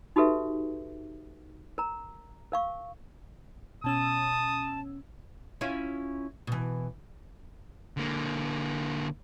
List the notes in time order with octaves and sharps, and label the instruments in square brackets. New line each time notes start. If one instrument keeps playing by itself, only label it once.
[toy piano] D#4 F#4 G4 A4 B4 E5
A#4 A#5
A#4 F5 C#6
[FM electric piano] B2 C#4 E6 [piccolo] A5 [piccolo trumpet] D#6
[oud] C#4 E4 F4
B2 E3
[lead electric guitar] D3 A#3